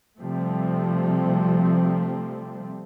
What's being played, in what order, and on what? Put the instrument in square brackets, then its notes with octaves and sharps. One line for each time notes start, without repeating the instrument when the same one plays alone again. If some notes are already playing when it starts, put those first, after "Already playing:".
[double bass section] C3 F3 G3 A3 C4